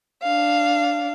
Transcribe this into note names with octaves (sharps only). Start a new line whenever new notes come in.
D4 F5